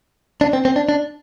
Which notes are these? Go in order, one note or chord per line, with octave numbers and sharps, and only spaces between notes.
D4
C4
C4
D4
D4